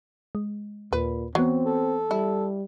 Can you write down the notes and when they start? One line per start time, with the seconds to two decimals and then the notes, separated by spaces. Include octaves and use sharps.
0.35 G#3
0.93 D#2 A#2 B4
1.35 E3 F#3 B3 C4
1.66 A4
2.11 G3 E4